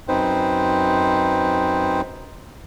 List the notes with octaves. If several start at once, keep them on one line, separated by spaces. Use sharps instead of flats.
F#2 C4 D#4 B4 C5